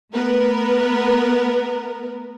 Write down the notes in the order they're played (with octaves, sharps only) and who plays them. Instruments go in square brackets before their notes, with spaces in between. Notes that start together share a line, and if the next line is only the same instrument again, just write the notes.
[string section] A3 B3 A#4 B4